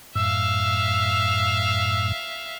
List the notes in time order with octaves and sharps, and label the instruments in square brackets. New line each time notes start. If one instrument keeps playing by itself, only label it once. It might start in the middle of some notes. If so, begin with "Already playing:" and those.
[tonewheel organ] F#2 A2 [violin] E5 F5 [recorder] E6